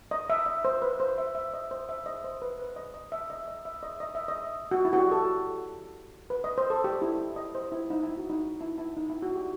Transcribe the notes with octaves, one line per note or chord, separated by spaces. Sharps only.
D#5
E5
D#5
C5
B4
C5
E5
E5
D#5
C5
E5
D#5
C5
B4
B4
D#5
D#5
E5
D#5
D#5
E5
D#5
D#5
E5
D#5
F#4
E4
F#4
G4
A4
B4
D#5
C5
A4
G4
E4
D#5
C5
E4
D#4
E4
F#4
D#4
E4
E4
D#4
E4
F#4
G4